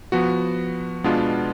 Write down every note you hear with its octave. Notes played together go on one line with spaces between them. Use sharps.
F3 B3 F#4
B2 G#3 B3 D4 F4